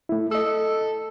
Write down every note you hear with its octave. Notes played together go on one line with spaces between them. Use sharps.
A3 E4
A4 D#5 E6